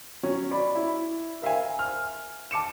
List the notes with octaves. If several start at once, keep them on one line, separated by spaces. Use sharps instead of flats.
F#3 C#4
D5 B5
E4
A#4 E5 F5 G#5
F6
A5 D6 C#7 E7